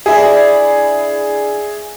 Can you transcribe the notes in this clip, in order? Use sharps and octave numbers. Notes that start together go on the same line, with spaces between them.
D4 E4 G#4 E5